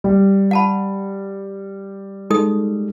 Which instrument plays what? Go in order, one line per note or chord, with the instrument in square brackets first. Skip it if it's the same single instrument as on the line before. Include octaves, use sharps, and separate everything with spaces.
[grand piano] G3
[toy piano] F#5 A5 B5
[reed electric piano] G#3 [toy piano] D#4 A4 D#6